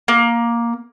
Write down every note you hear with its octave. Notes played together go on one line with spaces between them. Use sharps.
A#3